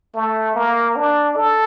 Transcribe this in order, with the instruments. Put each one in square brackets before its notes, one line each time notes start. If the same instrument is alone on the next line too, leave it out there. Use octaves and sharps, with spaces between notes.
[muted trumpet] A3
A#3
D4
A4